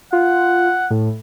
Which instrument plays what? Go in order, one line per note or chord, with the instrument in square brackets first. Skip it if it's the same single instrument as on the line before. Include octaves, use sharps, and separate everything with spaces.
[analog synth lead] F4 [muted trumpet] F#5
[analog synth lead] A2